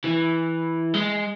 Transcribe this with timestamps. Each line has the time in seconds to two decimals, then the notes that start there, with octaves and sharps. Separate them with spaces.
0.04 E3
0.94 G#3